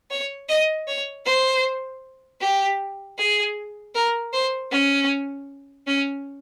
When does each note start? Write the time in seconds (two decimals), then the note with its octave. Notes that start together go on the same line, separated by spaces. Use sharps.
0.11 C#5
0.49 D#5
0.87 C#5
1.26 C5
2.41 G4
3.18 G#4
3.95 A#4
4.33 C5
4.72 C#4
5.87 C#4